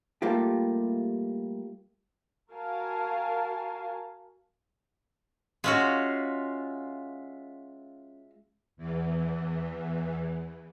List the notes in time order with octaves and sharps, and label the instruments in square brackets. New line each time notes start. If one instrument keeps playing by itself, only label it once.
[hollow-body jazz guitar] G3 A3 A#3 F4 G4
[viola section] F#4 A#4 F5 G#5 A5
[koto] G#3 C#4 F#4 [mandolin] F4 E5 F5
[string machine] E2 E3